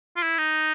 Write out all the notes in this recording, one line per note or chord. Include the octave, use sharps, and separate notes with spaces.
F4
E4
D#4